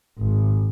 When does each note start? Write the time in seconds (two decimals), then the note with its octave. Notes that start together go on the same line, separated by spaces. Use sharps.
0.19 G#1